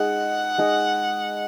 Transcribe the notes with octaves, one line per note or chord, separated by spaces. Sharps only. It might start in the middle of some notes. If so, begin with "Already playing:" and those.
Already playing: G#3 D#4 G#4 D#5 F#5
G#3 D#4 G#4 D#5